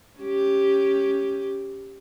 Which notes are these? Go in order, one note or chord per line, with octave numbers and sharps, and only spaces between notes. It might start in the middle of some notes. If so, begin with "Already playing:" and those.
C#4 G4